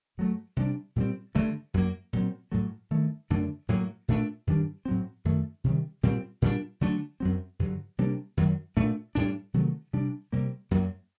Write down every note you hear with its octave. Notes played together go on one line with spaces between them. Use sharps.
G2 F#3 A3
C3 G3 D4
A#2 G3 C4
G2 D3 A3
F#2 F#3 A#3
A#2 F#3 C4
A2 F#3 A3
G2 D#3 A3
F#2 D3 A3 D4
A2 F#3 A#3
A#2 A3 D4
G2 D#3 G3 D4
A2 F#3 C4
F#2 D#3 A3
C3 D#3 G3
A#2 G3 C4
A#2 G3 D4
D3 F#3 A3 D4
F#2 F#3 C4
G2 D3 F#3
C3 G3 A#3 D4
F#2 D#3 F#3
A#2 A3 D4
A2 G3 D4
C3 D#3 F#3 A3
C3 G3 D4
C3 G3 A#3
F#2 F#3 A#3